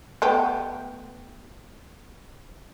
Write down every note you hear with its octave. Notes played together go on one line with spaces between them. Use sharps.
A3 B3 G4